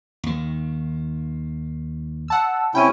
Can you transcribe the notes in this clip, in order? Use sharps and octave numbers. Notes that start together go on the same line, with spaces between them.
D#2 D#3
F#5 A5 E6
C3 C#4 E4 G5 D#7